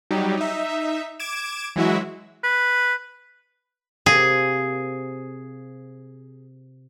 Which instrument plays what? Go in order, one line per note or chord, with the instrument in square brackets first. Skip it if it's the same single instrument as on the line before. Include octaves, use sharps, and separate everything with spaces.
[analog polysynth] F#3 G3 D#4 G4
D#4 E5
D6 G#6 D7 E7
E3 F#3 G#3 E4 F#4 E5
[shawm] B4
[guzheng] C3 A#3 F4 [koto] G#4